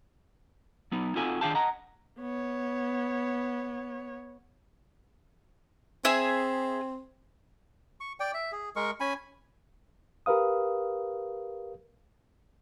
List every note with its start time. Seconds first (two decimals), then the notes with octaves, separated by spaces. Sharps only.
0.92 F#3 B3 D#4
1.15 C4 D#4 F4 F#4 A4 G#5
1.41 D#3 D4 G#4 F5 G5 A5
1.55 D#5 F#5 A#5
2.19 B3 C#5
6.05 C4 G#4 E5 G#5
8.00 C#6
8.20 D5 G5
8.34 E5
8.52 G#4
8.76 G#3 A#4 C#6
9.00 C#4 G#5 B5
10.26 G4 A#4 B4 F5 D#6